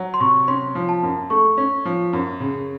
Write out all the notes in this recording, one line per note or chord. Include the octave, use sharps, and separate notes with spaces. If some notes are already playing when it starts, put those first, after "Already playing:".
Already playing: F#3
C6
C3 C#6
C#4 C6
F3
A5
F#2
A3 C#6
C#4
F3
F#2
C#3